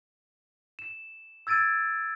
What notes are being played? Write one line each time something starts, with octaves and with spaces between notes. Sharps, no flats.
E7
E6 G#6 A6 D7 D#7